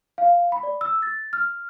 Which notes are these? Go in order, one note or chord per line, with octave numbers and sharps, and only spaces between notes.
F5
B5
D5
E6
A6
F6